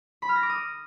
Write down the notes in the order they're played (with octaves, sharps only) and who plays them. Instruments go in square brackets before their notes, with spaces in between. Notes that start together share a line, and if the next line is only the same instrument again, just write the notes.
[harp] B5
F6
A#6
D6
D#6